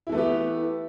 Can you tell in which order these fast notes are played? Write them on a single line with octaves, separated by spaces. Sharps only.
E4 E3 A3 B3 G4